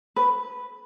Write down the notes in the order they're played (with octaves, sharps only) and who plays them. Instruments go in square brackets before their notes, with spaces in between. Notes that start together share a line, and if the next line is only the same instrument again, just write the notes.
[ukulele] B4